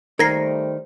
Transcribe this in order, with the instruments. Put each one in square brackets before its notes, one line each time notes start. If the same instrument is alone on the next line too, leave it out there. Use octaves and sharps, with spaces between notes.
[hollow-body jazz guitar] D#3 [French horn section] G3 A3 C5 [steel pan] A#4 [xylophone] G#6 A#6 C7